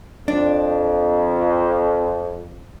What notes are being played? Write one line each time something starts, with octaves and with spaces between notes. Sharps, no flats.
F2 D4